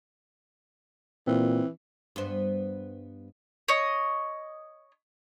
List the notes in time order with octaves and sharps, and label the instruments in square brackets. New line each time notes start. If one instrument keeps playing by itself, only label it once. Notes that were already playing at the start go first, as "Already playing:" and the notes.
[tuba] A#2 [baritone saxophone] E3 [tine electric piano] C4
[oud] G2 B3 C5
[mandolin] C#5 D#5